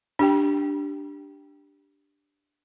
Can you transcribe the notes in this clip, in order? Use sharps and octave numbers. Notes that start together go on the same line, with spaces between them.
D4 G4 G5